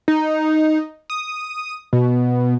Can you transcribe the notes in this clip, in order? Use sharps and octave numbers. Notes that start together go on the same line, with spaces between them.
D#4
D#6
B2